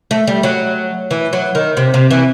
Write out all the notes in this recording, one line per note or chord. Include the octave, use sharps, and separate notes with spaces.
A3
G3
F#3
E3
F#3
D#3
C3
C3
E3